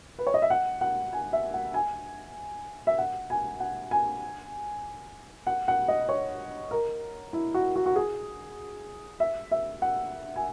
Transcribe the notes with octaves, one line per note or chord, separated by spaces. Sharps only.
B4
C#5
D#5
E5
F#5
F#5
G#5
E5
F#5
G#5
E5
F#5
G#5
F#5
G#5
F#5
F#5
D#5
C#5
A#4
E4
F#4
F#4
F#4
G#4
E5
E5
F#5
G#5